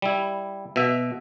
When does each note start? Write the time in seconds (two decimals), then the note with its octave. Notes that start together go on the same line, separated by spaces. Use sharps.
0.02 G3 E4
0.76 B2 E5